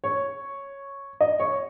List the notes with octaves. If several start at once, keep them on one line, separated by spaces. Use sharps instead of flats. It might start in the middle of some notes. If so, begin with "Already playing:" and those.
C#5
D#5
C#5